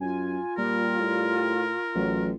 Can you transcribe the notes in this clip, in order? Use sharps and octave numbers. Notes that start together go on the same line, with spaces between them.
F#2 F4 G#5
A#2 G3 A#4
A2
A1 F#3